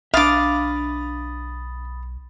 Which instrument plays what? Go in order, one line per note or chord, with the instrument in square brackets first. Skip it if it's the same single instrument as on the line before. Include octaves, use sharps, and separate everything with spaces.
[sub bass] B1 [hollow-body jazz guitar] D4 E5 [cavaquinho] F5 D6 [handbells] B5 D#6 A6